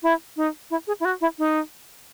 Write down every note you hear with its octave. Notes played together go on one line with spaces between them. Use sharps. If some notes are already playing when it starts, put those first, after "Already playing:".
E4
D#4
E4
G#4
E4
F#4
E4
D#4